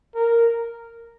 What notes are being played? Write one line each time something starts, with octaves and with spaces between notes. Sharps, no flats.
A#4